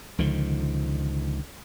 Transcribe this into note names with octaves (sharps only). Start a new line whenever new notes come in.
C#2 D3 D#3 F3